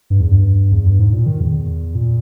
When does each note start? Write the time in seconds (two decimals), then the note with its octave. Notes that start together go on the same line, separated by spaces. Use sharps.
0.10 G2
0.20 E2
0.31 G2
0.72 E2
0.86 G2
0.99 G#2
1.13 A#2
1.26 D#3
1.41 E2
1.95 A#2